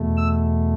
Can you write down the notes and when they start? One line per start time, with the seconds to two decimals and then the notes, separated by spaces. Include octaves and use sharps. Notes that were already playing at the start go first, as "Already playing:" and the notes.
Already playing: E2 B2 A3
0.17 E6